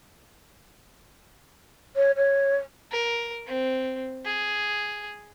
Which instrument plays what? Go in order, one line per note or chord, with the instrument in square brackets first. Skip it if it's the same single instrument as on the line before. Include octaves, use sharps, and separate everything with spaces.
[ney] C#5
C#5
[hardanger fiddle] A#4
C4
G#4